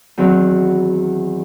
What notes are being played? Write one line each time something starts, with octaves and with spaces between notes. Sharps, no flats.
E2 D#3 F#3 C4